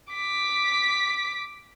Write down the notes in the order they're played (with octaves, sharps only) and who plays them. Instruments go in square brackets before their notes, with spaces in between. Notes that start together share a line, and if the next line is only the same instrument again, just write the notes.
[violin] D6 B6